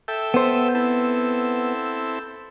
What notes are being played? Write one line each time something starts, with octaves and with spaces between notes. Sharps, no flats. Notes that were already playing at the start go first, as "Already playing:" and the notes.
A4 E5 G5
B3 C5
C4 E4 A4